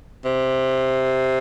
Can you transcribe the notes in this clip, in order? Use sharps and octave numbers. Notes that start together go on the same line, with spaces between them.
C3